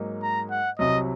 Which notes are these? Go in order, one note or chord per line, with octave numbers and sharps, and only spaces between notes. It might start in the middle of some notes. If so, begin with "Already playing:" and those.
Already playing: G#2 F#3 A#3 D#4
A#5
F#5
C2 C3 F#3 D#5